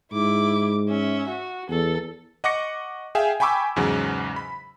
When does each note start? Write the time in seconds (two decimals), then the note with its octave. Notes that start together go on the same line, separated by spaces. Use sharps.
0.12 G#2 E4 D6
0.88 C#4 E5
1.28 F#4
1.69 E2 A4
2.44 D#5 F#5 C#6 D6 A#6 C#7
3.15 G#4 E5 F5 G5 G#5
3.40 G5 G#5 B5 C#6 D6 E6
3.76 E2 G#2 C#3 F#3
4.36 B5